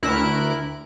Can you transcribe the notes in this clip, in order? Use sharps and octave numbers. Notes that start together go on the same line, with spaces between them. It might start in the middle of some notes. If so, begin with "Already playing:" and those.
D2 E4 A#4 F#6 D7